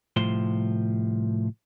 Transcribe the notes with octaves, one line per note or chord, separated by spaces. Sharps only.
C2 A2 F3 C5 C6